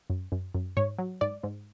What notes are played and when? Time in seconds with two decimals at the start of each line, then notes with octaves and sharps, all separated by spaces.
0.10 F#2
0.32 F#2
0.55 F#2
0.77 G#2 C#5
0.98 F#3
1.21 G#2 D5
1.43 G#2